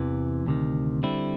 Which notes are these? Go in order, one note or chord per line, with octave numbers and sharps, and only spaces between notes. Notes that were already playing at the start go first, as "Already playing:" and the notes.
Already playing: E2 C3 E3
D2 C3 D#3
D3 G3 C4 E4